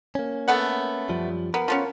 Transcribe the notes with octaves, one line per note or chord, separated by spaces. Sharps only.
A#3 C#4
A3 B3 F#5
F#2 F3 G3
B3 A#4
F3 B3 C#4